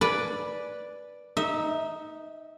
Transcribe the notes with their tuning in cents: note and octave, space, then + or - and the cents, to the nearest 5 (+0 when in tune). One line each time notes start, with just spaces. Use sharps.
B4 -5 D5 +0 G#5 +30
D#4 +0 E5 -25